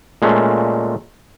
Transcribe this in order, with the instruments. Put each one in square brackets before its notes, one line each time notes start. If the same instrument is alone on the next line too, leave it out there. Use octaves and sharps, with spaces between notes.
[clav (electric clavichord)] A#2 G#3 A3 C#4